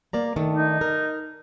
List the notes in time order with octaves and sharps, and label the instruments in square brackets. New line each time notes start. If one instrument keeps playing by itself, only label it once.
[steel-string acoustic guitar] A#3 D5 A#5
D#3 A3 D4
[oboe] D#4
[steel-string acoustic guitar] A#4